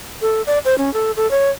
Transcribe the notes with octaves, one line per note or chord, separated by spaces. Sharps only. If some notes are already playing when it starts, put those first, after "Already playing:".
A4
D5
C5
C#4
A4
A4
C#5